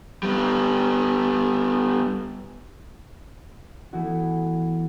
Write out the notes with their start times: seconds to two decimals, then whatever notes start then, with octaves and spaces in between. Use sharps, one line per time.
0.23 G3 B3
3.93 E3 A3 B3 E4 F#4